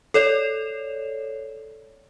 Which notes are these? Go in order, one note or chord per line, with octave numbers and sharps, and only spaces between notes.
A4 C#5 D5